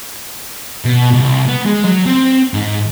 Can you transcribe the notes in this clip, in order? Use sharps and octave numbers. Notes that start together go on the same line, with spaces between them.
B2
C2
B3
G#3
F#3
C4
G#2